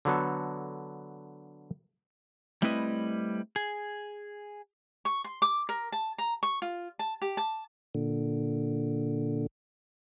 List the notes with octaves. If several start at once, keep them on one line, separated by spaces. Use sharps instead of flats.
D3 F#3 B3 A4
G3 A3 C4 E4 B4 D#5
G#4
C#6
C6
D6
A#4
A5
A#5
C#6
F4
A5
G4
A5
A#2 D3